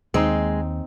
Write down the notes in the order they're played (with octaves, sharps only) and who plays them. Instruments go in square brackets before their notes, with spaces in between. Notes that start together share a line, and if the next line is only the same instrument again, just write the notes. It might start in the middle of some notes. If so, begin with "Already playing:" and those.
[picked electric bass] D#2 [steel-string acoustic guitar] G#3 [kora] C4 D#4